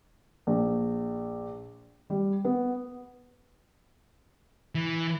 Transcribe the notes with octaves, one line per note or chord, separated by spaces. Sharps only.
A#1
G3
B3
E3